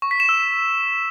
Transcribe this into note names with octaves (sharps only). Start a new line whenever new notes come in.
C#6
B6
E7
E6